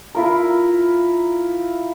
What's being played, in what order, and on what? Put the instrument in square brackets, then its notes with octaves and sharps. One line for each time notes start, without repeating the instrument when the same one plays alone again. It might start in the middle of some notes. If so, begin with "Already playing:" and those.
[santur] E4 F4 A#4